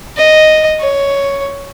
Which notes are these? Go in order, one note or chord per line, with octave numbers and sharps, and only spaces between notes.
D#5
C#5